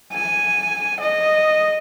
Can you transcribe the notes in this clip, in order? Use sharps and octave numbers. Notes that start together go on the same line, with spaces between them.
G#5
D#5